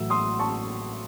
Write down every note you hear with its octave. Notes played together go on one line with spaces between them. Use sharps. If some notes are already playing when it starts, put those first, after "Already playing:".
Already playing: A1 A2 F#3 E6
C6 D#6
A5 C#6